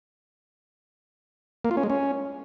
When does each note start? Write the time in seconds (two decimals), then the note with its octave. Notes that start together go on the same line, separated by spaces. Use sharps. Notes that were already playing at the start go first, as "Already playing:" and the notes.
1.65 A#3
1.71 F4
1.77 C#4
1.83 G#3
1.90 C#4